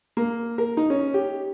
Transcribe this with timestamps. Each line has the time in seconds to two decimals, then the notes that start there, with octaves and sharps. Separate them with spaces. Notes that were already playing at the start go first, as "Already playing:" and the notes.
0.17 A#3
0.58 A#4
0.77 D#4
0.90 C#4
1.14 G4